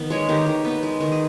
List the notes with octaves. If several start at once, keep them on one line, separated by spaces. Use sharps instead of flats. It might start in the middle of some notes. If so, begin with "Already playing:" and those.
Already playing: D#3 B3
G#3 C#5
D#3 G4
D#3
B3
G#3
D#3
G#4